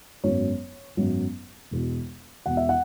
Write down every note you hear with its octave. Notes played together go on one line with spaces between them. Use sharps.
G#1 F#2 F#3 B3 C#5
G#1 F#2 F#3 B3
E1 E2 B2
E1 E2 B2 F#5
E5
F#5